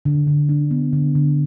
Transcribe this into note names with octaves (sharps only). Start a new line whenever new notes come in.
D3
D3
D4
B3
D3
D3